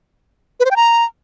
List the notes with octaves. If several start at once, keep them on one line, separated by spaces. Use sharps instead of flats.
B4
C5
G5
A#5